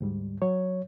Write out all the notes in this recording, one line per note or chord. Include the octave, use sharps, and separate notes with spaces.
D2 G#2 G3
F#3 C#5